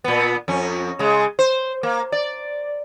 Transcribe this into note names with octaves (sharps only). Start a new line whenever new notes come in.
A#2 B3
F2 C#4
C#3 G#3
C5
A#3
D5